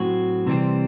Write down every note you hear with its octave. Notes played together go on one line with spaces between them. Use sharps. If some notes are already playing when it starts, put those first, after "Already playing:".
Already playing: A2 F#3 C4 F#4
C3 E3 G3 C4